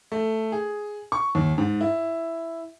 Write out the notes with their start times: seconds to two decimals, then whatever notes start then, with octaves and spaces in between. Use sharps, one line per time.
0.12 A3
0.52 G#4
1.12 C#6
1.35 D#2
1.58 G#2
1.81 E4